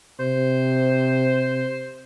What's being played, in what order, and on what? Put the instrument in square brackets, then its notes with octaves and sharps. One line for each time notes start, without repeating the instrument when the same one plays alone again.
[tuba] C3 [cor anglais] C5